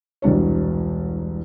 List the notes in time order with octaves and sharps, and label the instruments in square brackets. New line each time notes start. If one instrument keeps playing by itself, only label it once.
[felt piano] E1 C2 D4 C#5